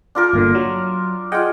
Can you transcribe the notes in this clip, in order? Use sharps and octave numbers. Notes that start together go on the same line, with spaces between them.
D4 F4 A#4
G1 A#2 D3
F#3
F4 G#4 D#5 F#5 G5